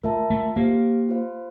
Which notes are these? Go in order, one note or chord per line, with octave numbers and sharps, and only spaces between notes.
A3 F4 A#4 E5 A5
A3
A#3 G4 C5 F5
F4 C5 F5